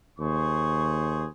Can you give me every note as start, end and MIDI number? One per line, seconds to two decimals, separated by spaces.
0.19 1.26 39
0.19 1.28 68
0.19 1.28 72
0.19 1.28 85